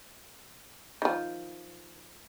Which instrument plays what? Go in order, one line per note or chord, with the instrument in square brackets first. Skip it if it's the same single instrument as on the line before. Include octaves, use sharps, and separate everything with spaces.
[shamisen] D#3 F3